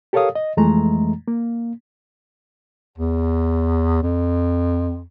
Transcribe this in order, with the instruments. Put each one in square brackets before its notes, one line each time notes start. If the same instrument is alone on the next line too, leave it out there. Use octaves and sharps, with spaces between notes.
[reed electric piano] G4 A4 A#4 C#5 F5 D#6
D#5
F2 E3 G#3 A3 A#5
A#3
[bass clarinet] E2
F2